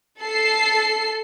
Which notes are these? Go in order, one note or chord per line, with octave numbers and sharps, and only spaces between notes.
A4 C7